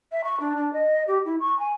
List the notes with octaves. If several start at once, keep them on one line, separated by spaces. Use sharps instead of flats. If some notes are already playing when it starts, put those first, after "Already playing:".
E5
C#6
D4
D4
D#5
G4
E4
C#6
G#5